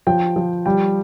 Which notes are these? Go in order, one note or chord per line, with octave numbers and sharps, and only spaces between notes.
F3 G5
F3
G3 G5